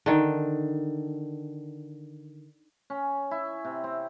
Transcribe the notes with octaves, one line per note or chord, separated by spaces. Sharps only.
D3 D#3
C#4
E4
C3
C4